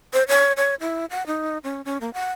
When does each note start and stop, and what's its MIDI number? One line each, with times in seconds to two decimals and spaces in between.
0.13 0.23 72
0.28 0.52 73
0.57 0.75 73
0.81 1.05 64
1.10 1.26 78
1.27 1.58 63
1.64 1.82 61
1.85 1.98 61
2.01 2.13 58
2.14 2.31 78